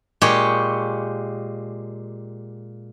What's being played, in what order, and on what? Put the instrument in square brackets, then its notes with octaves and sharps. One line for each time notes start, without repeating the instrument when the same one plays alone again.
[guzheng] A#2 G#3 G4 C#5